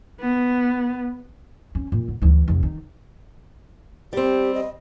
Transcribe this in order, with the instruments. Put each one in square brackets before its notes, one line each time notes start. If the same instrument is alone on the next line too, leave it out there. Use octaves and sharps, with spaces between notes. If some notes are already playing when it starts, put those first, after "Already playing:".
[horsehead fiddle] B3
[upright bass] C#4
A#2
D3
D2 E3
F1 D2
D#3
[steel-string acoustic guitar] G3 C4 [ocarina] G4
[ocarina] D#5